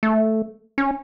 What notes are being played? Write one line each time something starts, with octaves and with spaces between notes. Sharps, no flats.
A3
C#4